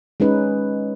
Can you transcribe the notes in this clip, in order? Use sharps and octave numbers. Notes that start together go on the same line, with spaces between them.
G#3 C#4 D#4 B4